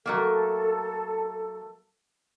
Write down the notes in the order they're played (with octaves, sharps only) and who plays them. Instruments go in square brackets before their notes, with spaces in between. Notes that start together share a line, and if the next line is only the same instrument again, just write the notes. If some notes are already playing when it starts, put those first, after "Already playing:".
[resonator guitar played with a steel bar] F#3 A3 A#3 [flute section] A4